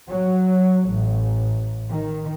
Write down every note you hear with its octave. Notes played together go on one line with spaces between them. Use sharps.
F#3
A1
D#3